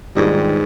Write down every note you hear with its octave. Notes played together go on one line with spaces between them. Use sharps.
D#2 G#2 D#3 G3 D4 F4